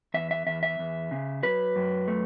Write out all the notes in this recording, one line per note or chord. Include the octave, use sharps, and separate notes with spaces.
E2 E5
E5
E2 E5
E5
E2
C#3
F#3 B4
F#2
A3